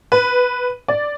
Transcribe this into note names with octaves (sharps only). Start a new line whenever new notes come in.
B4
D5